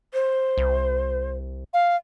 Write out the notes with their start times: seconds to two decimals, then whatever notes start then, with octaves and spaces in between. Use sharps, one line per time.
0.13 C5
0.58 C2
1.74 F5